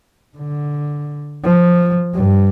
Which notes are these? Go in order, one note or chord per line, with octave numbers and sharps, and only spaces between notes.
D3
F3
G2